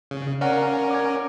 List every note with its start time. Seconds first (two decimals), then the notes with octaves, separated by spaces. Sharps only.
0.11 C#3
0.41 C#4 A#4 D5 F5 F#5
0.91 D6 G#6